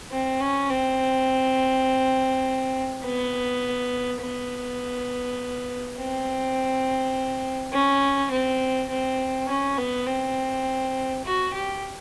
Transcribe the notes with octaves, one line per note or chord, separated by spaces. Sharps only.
C4
C#4
C4
B3
B3
C4
C#4
C4
C4
C#4
B3
C4
F#4
G4